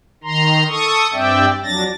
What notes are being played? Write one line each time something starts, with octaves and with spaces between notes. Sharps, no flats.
D#3 A#5 C6
A4 C#6 D#6
G2 C4 D5 E5 G5
F2 F#3 D4 A6 A#6